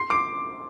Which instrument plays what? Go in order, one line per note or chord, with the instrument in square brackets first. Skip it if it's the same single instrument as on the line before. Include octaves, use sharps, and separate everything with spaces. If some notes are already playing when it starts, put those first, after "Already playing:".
Already playing: [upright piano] C6 C7
D6 D7